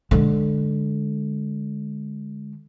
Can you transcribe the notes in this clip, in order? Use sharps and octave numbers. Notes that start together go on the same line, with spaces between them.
D3 G#3